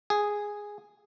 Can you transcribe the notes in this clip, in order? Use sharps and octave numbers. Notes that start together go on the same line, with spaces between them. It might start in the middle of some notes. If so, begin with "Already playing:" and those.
G#4